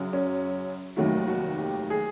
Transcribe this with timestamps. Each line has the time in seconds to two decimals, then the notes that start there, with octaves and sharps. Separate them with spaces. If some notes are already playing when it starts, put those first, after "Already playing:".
Already playing: F#2 C#3 F#3
0.13 C#4
0.96 F1 D#2 D#3 F#3 A3 F#4
1.28 F#4
1.58 G4
1.90 G#4